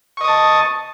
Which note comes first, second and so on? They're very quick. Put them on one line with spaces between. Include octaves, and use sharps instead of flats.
C#6 D#5 D#6 A5